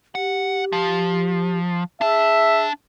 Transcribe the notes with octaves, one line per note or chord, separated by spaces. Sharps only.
G4 F#5
F3
D4 G#4 E5 A5